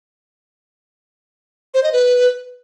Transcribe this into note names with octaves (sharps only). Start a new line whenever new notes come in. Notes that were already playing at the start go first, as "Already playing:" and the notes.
C5
D#5
B4